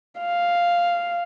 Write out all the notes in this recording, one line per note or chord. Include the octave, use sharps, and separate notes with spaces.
F5